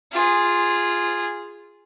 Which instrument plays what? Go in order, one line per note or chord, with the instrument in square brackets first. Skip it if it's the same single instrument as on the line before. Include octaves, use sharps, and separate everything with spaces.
[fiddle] F4 G#4